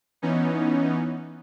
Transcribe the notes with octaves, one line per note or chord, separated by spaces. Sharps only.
E3 B3 C#4 D#4